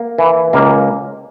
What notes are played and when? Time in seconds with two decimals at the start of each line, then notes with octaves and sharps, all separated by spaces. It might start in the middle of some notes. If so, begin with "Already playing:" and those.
Already playing: A#3
0.18 E3
0.53 C#2 A#3